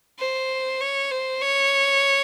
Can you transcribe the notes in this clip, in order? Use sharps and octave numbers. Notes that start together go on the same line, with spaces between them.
C5
C#5
C5
C#5